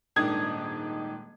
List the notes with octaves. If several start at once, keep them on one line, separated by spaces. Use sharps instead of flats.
D#1 G#2 D#3 D4 D#6 G#6